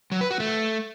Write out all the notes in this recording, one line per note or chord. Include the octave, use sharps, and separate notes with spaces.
F#3
B4
F#4
A3